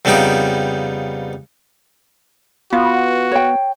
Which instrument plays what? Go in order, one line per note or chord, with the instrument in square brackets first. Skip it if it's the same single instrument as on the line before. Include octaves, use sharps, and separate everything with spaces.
[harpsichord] F2 C#3 G3 B3 D#4 G5
[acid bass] B3 [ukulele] F4 [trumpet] F#4
[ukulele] C#5 G5